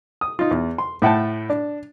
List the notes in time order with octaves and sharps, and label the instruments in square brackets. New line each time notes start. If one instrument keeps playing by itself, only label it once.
[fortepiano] D#6
D#4 F4
E2
C6
A2 E5 F#5 G5 A5
D4